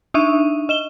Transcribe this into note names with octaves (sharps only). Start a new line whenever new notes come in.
D4 D#4 E5 C#6 D#7
D#5 E7 G7